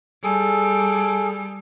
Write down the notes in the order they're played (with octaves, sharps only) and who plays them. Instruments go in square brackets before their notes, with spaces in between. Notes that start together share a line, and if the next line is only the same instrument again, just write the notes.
[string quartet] G3 [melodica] G#4 A4